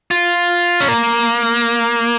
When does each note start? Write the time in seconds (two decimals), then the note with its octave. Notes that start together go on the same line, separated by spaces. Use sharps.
0.11 F4
0.80 C#4
0.88 A#3